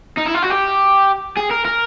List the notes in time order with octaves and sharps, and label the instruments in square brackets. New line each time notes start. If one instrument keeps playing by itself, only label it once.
[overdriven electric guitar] D#4
E4
F4
F#4
G4
G#4
A#4
A#4